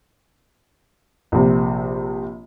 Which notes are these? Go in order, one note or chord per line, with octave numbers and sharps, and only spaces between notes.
A#1 C3